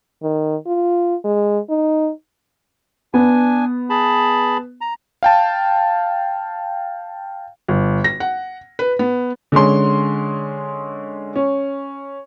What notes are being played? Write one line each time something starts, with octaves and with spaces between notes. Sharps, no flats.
D#3
F4
G#3
D#4
B3 D4 G#5
G#4 A5 B5
A#5
F5 G5 A5
G1
A#6
F#5
B4
B3
D3 G#3 C#4 C6
C#4